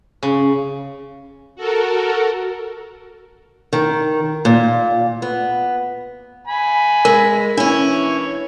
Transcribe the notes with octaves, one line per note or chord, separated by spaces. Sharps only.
C#3
F#4 A4 A#4
D#3
A#2
B3
G#5 B5
G#3 A#4
E3 C#4 D4 E4 C#5